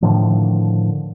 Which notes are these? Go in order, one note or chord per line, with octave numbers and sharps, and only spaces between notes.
A2 D3 D#3 F3